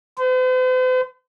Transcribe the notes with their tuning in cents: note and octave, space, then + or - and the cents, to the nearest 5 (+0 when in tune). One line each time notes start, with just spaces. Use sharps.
C5 -45